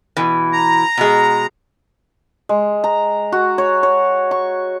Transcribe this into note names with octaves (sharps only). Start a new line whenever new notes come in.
B2 E3
A#5
B2 G#3
G#3
A#5
F#4
C#5
C#5
C#6